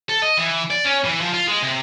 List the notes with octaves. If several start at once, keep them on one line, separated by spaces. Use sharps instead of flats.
A4
D#5
E3
D5
C#4
E3
F3
F4
G#3
C3